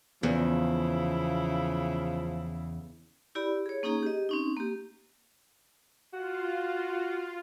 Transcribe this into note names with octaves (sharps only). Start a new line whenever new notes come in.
E2 C#3 F3 E4
E4 G4 D5 B5
G#4 C#5
A#3 C#4 D#4 G#4 A#5
G4 D#5
C4 C#4 D#4
A#3 G4
F4 F#4